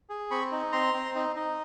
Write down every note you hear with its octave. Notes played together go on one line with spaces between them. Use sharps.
G#4
C4 B5 C#6
D#4
C4 A#5 C6
C4
D#4
D#4